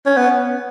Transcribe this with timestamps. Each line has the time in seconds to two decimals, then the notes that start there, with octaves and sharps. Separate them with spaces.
0.06 C#4
0.17 B3